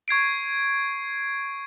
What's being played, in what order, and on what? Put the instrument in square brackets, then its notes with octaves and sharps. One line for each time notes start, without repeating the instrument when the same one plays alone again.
[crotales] C#6 G#6 C7 D7